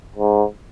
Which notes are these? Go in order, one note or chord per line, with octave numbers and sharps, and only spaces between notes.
G#2